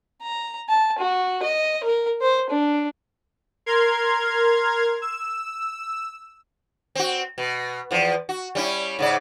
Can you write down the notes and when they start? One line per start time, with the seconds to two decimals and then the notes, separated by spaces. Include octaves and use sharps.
0.23 A#5
0.69 A5
0.99 F#4
1.43 D#5
1.84 A#4
2.22 C5
2.50 D4
3.66 A#4 C6 F6 G#6
5.02 E6
6.95 C4 F#4
7.38 B2
7.91 E2 F3
8.29 F#4
8.55 G3 C#4 E4
8.99 G#2 C#3 D5